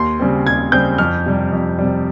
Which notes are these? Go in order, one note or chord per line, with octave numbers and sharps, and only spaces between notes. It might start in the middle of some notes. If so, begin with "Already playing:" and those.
Already playing: D#2 C6
C#3 G3 C4
D#2 G#6
C#3 G3 C4 G6
F2 F6
C3 G3
F2
C3 G3